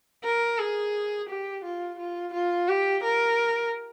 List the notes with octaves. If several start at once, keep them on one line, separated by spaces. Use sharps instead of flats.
A#4
G#4
G4
F4
F4
F4
G4
A#4